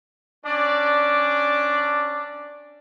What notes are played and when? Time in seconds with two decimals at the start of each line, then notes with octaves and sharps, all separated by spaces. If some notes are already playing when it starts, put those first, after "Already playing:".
0.45 C#4 D4 D5